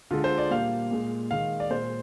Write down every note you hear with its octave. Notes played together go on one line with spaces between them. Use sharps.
D3 G#3 F4
C5
D5
A#2 G3 A#3 F5
A#2 G#3
D#3 G#3 F5
D5
A#2 G#3 C5